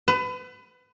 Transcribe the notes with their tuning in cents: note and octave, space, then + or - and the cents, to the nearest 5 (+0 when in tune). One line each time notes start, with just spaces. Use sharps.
B4 +30